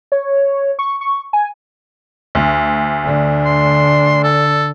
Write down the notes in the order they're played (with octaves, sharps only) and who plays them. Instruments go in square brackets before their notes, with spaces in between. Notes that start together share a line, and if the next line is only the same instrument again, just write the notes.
[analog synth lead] C#5
C#6
C#6
G#5
[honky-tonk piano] D2
[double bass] D3 D4
[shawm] C6
A4